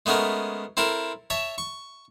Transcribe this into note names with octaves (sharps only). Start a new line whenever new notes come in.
G#3 A3 B3 C#4 A#4
C4 E4 A4 A#4
C#5 E5 A5
C#6